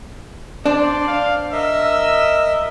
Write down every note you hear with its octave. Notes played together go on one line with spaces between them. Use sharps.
D4 C5 D5 C6
F5
A#4 D#5 E5 E6